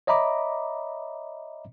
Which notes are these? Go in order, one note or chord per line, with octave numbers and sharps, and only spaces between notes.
C#5 D#5 E5 A#5 B5 D6